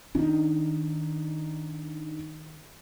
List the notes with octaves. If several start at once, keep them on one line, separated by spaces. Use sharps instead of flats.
D#3 D4 D#4